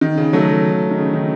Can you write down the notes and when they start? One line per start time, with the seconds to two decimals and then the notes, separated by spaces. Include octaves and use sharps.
0.01 D#3
0.17 C#3
0.33 F#3 A3
0.91 D#3
0.98 C#3
1.13 D#3